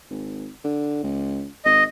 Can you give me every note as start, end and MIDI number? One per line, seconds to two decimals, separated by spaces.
0.10 0.49 32
0.64 1.02 50
1.03 1.48 37
1.65 1.85 32
1.65 1.84 75